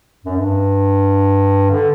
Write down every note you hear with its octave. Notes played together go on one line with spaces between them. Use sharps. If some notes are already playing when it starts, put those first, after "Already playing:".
F#2
G2
D3